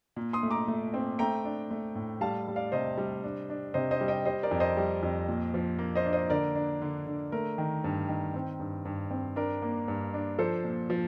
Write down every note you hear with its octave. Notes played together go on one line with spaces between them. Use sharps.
A#2
C6 D#6
A3
A#5 D6
A3
C4
A3 G5 A#5
D4
A3
A2
G3 F5 A5
G3
D5 F5
C3 C5 D#5
G3
D4
D4
C3 C5 D#5
C5 D#5
G3
D#5 G5
G3 C5 D#5
A#4 D5
F2
C5 D#5
G3
F2
A#2
F3
A#3
C5 D#5
D4
C5 D#5
D3 A#4 D5
D4
D3
D3
A3 A#4
D#3
G2
D#3
C4
G2
G2
C4
D4 A#4
A#3
G2
D4
F3 A4 C5
A#2
F3